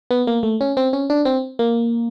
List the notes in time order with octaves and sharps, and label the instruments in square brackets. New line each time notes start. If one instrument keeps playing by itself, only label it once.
[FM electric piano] B3
A#3
A3
C#4
C4
C#4
D4
C4
A#3